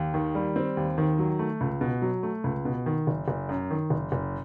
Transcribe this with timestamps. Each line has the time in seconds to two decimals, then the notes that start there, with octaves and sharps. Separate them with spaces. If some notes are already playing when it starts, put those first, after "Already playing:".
Already playing: D#2
0.14 D#3
0.35 G3
0.56 C4
0.77 D#2
0.98 D#3
1.19 F#3
1.39 A3
1.61 C#2
1.81 B2
2.02 F#3
2.23 A3
2.44 C#2
2.65 B2
2.86 D#3
3.07 F#1
3.28 F#1
3.49 F#2
3.71 D#3
3.90 F#1
4.12 F#1